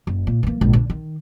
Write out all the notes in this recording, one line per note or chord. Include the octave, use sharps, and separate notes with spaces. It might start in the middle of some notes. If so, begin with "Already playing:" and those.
F#1
A#2
E3 A#3
A#1 G#2
D3
D#3